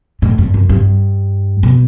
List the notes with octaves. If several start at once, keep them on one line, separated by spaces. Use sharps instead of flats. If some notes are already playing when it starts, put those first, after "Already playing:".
A2
G2
F#2
G2
B2